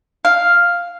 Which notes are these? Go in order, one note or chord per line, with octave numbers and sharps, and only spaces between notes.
F5